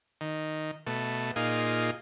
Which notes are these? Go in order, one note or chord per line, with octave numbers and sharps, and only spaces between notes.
D#3
B2 A3
A#2 D#4 F4 G#4